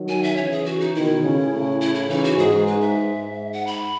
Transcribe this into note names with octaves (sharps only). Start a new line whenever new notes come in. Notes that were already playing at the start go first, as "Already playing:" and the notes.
Already playing: D#3 F#3
G#5
E5
C#3 E3 C#5
G#4
F#4
D#4
B2 D#3 E4
A2 C#3
A2 C#3
E4
E4
C#3 E3 D#4
F#4
G#2 G#4
B4
E5
G#2
F#5
B5